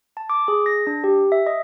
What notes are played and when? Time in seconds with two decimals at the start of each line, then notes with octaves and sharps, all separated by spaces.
0.17 A5
0.30 D6
0.48 G#4
0.66 A#6
0.87 D4
1.04 G4
1.32 E5
1.47 D#5